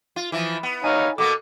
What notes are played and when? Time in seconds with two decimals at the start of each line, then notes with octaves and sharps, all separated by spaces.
0.16 F4
0.32 E3 F3
0.63 B3
0.84 D#4 C#5 F5 G#5
1.18 B2 A#3 B3 A4 D6